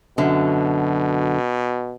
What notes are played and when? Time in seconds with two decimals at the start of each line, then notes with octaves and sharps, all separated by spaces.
0.18 F#2 B2 D3